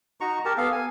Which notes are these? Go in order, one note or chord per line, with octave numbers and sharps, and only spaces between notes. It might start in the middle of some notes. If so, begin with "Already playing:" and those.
D#4 F#4 A#5 C#6
G4 A#4 A5
B3 A4 F5
G#5